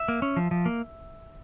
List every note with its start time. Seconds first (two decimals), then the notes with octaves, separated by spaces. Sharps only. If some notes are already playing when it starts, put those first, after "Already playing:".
Already playing: E5
0.08 A#3
0.22 C#4
0.37 F3
0.51 F3
0.66 A#3